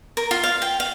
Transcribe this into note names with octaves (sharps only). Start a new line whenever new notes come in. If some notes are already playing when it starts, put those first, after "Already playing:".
A#4
F4
F5
G5
F5